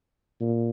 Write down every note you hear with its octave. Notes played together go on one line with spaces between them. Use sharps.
A#2